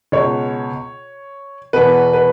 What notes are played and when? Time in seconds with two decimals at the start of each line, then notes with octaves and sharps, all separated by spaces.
0.12 C#2 B2 C#5
1.73 E2 B2 B4
2.13 B4